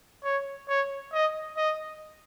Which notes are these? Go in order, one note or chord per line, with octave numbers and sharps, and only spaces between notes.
C#5
C#5
D#5
D#5